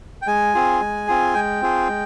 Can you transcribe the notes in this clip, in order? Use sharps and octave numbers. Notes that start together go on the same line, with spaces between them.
G5
G#3 G#5
C4 F4 G#4
G#3
C4 F4 G#4
G#3 G5
C4 F4 G#4
G#3